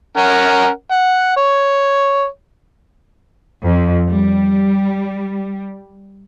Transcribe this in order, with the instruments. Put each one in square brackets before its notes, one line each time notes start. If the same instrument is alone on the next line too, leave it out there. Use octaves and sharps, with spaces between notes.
[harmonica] C#4 A#4 F#5
F#5
C#5
[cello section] F2
G3